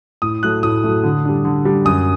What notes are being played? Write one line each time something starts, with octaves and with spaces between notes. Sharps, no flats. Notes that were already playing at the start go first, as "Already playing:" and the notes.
A2 D#6
F#3 A3 F#6
A2 D#6
F#3 A3
D3
G3 D4
D3
G3 D4
F#2 D#6